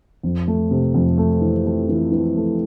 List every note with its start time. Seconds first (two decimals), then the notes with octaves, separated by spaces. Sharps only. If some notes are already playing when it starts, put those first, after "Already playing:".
0.23 F2
0.47 A3
0.71 C3
0.94 F2
1.18 A3
1.41 E3
1.66 A3
1.89 E3
2.12 E3
2.36 A3